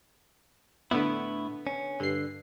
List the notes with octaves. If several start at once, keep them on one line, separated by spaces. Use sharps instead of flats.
A2 D3 B3 E4
C#4
G2 D3 C7